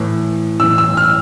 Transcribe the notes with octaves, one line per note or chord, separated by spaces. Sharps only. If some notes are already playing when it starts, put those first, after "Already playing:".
Already playing: A2 E3
A2 E3 E6
E6
F6